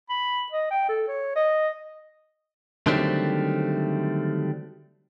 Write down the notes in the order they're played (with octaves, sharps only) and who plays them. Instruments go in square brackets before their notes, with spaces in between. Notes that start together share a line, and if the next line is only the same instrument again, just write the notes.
[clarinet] B5
D#5
G5
A4
C#5
D#5
[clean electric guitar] D3 D#3 F#3 G3 A3 C4